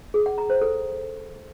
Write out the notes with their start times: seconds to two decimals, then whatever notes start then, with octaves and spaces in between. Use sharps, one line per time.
0.14 G#4
0.26 F#5
0.38 A#5
0.50 C5
0.62 A4